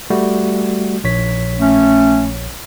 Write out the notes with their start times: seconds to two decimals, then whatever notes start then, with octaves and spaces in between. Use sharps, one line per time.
0.10 G3 A3 F#4
1.04 A#1 C#5 B6
1.59 A3 C#4